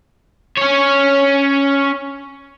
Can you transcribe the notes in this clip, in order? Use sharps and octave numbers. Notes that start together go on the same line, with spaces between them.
C#4 C#5